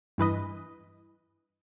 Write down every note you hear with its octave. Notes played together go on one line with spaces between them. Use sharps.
G2 E3 B4 D#5